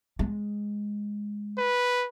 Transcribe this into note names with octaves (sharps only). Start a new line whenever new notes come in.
G#3
B4